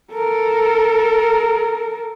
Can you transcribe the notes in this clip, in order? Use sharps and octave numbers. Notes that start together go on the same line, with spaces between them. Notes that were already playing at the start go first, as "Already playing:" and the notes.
A4 A#4